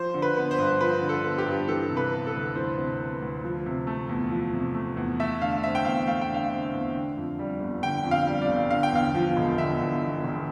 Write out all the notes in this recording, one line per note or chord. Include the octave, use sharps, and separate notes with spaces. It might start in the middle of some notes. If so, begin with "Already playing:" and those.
Already playing: F3 C5
D3
B4
B3
C5
G2
F3 B4
D3
A4
B3
G4
G2
E3 A4
C3
B4
B3
A4
D2
E3 C5
C3
B3
D2
F3
C3
A3
E2
F3
C3
A3
E2
A3 E5
D3 F5
C4 E5
G5
E2 F5
A3 F5
G5
D3
F5
C4
E2
D3
F2
G3
G1
D3 G5
F2
F5
G3
D5
G1
D3 F5
G5
E2 F5
F3
E1
D3 E5
E2
F3
E1